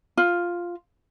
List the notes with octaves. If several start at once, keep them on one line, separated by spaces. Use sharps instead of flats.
F4